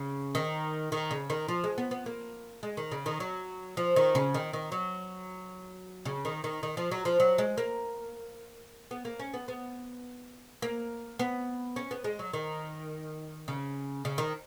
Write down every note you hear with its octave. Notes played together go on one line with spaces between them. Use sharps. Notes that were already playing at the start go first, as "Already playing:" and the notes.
Already playing: C#3
D#3
D#3
C#3
D#3
F3
G#3
B3
B3
A#3
G#3
D#3
C#3
D#3
F#3
F3
D#3
C#3
D#3
D#3
F#3
C#3
D#3
D#3
D#3
F3
F#3
F3
F#3
G#3
A#3
B3
A#3
C#4
B3
B3
A#3
B3
C#4
B3
G#3
F#3
D#3
C#3
C#3
D#3